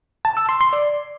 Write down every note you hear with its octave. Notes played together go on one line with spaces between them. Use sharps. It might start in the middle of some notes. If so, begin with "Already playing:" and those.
A5
E6
C6
C6
D5